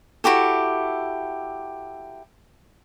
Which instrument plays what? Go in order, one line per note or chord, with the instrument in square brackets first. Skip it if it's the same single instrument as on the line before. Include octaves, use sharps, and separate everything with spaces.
[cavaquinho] E4 F#4 G4 A4